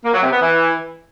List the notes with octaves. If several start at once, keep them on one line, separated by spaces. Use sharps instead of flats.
A#3
F#3
C3
B3
E3